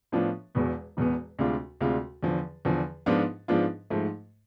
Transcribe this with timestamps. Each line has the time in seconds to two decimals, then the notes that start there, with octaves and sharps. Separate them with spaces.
0.12 A2 F3 B3 D4 F4
0.55 E1 E2 B2 B3
0.97 E1 E2 B2 B3
1.39 D2 C3 G#3 D4 F4
1.81 D2 C3 G#3 D4 F4
2.23 E2 D3 F3
2.65 E2 D3 F3
3.06 G#2 F3 B3 D4 F4
3.48 G#2 F3 B3 D4 F4
3.90 G#2 F3 A3